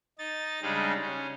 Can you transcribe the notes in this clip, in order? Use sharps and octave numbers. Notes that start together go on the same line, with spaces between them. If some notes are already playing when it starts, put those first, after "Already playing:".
D#4 A6
C#3 G3 G#3 D4 D#4
C#4